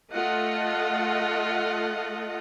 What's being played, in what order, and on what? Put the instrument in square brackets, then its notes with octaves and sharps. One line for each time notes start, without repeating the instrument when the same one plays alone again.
[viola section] A3 F4 A4 D#5 F#5